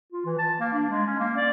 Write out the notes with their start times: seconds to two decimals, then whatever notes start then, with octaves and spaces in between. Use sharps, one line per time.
0.12 F4
0.25 E3
0.38 A5
0.60 A#3
0.73 D4
0.90 G#3
1.06 C#4
1.19 A#3
1.36 D5